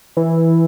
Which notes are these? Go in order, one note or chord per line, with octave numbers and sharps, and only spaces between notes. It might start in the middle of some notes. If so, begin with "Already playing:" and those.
E3